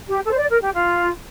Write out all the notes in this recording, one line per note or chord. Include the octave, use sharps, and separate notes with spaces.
G4
A4
C5
D5
A#4
G4
F4